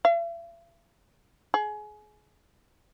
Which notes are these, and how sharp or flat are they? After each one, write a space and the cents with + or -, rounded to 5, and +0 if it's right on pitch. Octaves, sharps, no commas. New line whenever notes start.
E5 +45
G#4 +25